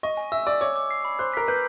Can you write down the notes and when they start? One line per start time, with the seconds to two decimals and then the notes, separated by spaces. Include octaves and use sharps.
0.03 D#5 C#6
0.17 G#5
0.32 E5 E6
0.47 D5 E6
0.61 C#5 D6
0.76 D6
0.91 C7
1.05 B5
1.19 C5 F#6
1.34 A#4 B6
1.48 B4 G6